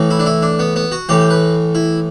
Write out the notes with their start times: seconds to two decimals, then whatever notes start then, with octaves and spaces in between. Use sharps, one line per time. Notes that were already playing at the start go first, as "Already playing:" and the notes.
Already playing: A2 E3
0.10 E4
0.19 D4
0.26 E4
0.42 D4
0.59 B3
0.76 B3
0.92 F#4
1.09 A2 E3 G4
1.30 B4
1.75 E4